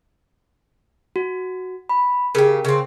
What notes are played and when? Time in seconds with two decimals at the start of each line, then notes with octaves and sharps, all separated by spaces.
1.16 F#4
1.89 B5
2.35 C#3 G4 A#4
2.65 C#3 C4